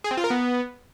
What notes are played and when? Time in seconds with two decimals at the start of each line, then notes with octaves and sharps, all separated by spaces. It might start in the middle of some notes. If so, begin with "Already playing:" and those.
0.04 G#4
0.11 C4
0.17 F4
0.24 A#4
0.30 B3